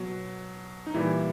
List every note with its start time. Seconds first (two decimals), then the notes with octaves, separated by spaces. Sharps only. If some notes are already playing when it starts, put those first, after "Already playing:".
Already playing: B2 F#3 F#4
0.87 D#4
0.94 A#2 E3 G3 E4